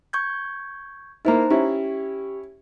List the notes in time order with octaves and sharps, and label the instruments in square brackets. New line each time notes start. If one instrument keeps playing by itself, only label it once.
[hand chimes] C#6 G6 G#6
[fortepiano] A#3 E4 [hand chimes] D#4 C5 A#5
[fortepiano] C#4 E4 [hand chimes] G4